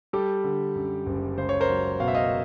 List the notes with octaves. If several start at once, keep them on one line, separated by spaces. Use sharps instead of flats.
G3 G4 A4
D3
F#2
F#1
C#2 C5
C#5
A#4 C5
F#3
B2 F5
E5
D#5 F5